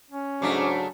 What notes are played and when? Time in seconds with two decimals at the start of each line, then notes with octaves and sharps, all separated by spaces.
0.11 C#4
0.42 G#2 C#3 F#3 A3 D4 D6